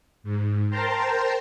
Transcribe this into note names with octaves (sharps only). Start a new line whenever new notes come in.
G#2
A#4 C5 G5 A5 A#5 C6